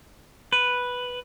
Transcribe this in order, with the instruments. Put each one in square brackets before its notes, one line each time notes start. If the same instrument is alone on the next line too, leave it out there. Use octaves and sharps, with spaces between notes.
[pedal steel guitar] B4